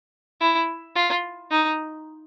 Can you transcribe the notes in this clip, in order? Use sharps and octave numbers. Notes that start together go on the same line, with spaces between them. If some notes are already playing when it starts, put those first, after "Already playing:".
E4
F4
D#4